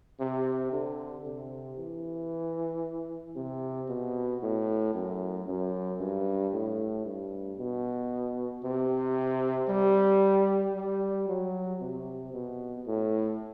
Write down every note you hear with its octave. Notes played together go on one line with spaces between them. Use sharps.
C3
D3
C3
E3
C3
B2
A2
F#2
F#2
G2
A2
G2
B2
C3
G3
G3
F#3
C3
B2
A2